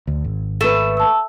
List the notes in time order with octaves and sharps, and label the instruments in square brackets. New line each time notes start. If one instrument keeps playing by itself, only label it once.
[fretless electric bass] D2
G#1
[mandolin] A3 [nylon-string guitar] A4 B4 [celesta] E7
[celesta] A5 E6